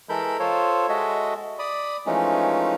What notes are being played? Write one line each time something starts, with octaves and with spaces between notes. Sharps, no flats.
E3 G#3 A4 A#4 B5 G6
F4 A4 C5 C#5
G#3 F#4 A4 D#5 E5
D5 B5 D#6
E3 F3 G#3 A3 C#4 D#4